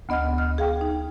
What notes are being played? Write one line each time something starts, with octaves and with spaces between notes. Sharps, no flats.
D2 B3 D#5 F#5 F6
F6
G#4 F5 G5
D#4